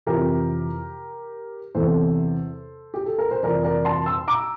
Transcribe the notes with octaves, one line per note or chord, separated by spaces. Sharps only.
F2 C3 E3 G4 A#4
E2 C3 E3 A4 C5
G4
A4
A#4
C5
F2 C3 E3 A#4 D5
A#4 D5
A5 C6
C6 E6
A#5 D6